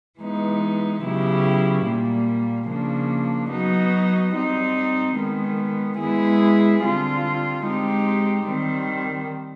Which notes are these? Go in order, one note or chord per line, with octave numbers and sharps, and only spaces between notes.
E3 G#3 B3 D#4
C#3 F#3 B3 E4 G4
A#2 G3 A#3
C#3 F3 A#3 D4
F#3 B3 D#4 F#4
G3 C4 D#4
D#3 G#3 B3
G#3 B3 E4 G#4
D3 G3 C4 F4
G#3 C4 D#4 G4
D#3 G3 C4